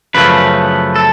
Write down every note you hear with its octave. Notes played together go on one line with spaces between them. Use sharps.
F#2 C#3 F3 A3 B4
A4